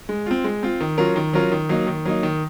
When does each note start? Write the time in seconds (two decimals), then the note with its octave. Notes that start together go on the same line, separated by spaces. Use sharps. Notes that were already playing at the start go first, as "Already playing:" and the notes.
0.09 G#3
0.26 C4 F4
0.44 G#3
0.63 C4 F4
0.81 D#3
0.98 F#3 C#4 F4 A#4
1.16 D#3
1.33 F#3 C#4 F4 A#4
1.52 D#3
1.69 F#3 A#3 D#4
1.87 D#3
2.05 F#3 A#3 D#4
2.23 D#3